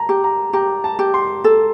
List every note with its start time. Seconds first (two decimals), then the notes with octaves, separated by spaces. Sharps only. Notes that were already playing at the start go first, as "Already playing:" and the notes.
Already playing: A5 A#5
0.09 G4
0.24 A#5
0.53 G4 A#5
0.84 A5
0.99 G4
1.14 C6
1.44 A4